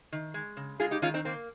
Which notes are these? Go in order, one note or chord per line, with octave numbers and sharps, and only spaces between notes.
D#3
G#3
C#3
G#3 F4 G#4
D#4 G4
D#3 C#4 F4
C4 D#4
A#3 C4